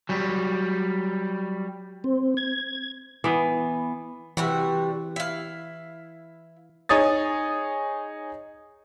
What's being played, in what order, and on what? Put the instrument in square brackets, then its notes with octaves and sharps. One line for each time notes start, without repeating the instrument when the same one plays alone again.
[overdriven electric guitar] F#3 G3
[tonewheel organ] C4
G#6
[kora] E3 B3
[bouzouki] C3 G3 F#4 [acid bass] E3
[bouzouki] E4 F5
[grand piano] D#4 G#4 C#5 D#6 A6